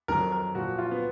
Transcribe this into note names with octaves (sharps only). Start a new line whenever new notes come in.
F2 D#3 F#3 A#4
A#4
A#2 F3 F#4
F4
B3